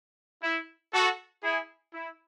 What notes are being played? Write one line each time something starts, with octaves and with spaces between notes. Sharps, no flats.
E4
F#4 A4
E4 G#4
E4